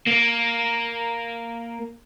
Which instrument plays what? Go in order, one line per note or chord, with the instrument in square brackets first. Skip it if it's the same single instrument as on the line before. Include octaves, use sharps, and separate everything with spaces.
[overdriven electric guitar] A#3